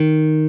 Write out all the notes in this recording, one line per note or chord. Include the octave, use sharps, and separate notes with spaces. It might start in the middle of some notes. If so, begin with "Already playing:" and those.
Already playing: D#3